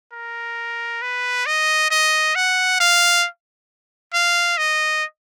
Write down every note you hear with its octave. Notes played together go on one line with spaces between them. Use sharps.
A#4
B4
D#5
D#5
F#5
F5
F5
D#5